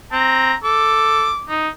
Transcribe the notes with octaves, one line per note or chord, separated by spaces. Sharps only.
C4 A#5
A4 D6
D#4